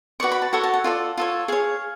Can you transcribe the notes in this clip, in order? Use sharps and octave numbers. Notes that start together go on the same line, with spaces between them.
F#4 B4 D5 C#6
B5
A5
F#4 A4 C#5 F#5
A5
F#5
F4 A4 D5
F4 A4 C#5
G#4 C#5 F5